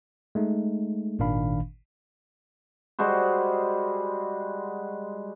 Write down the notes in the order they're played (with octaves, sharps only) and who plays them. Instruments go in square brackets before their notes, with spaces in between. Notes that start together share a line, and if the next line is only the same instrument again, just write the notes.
[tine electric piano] G#3 A3 D#4
G#1 A#2 D#3 D4 F5 B5
[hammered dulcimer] G3 G#3 F#4 C5